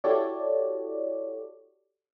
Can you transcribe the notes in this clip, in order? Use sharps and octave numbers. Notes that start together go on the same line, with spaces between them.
E4 F#4 G4 A4 C#5 D5